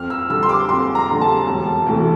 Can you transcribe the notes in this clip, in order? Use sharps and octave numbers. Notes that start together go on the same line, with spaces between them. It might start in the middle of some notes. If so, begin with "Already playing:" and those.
Already playing: F2 F6
E6
D3 G3 E6
C6
D6
F2 C6
A#5
D3 G3
A5
E1
D2 C3 E3 A3